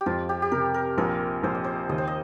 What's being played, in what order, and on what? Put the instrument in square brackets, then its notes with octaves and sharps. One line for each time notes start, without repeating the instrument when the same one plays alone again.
[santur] G4
[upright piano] F2 [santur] F4
[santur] G4
G4
[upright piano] C3 [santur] A#4
[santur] A#4
[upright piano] A#1 [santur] A#4
[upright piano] A#1 [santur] C5
[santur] D#5
C5
[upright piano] D#2 [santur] D#5
[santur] C5
D#5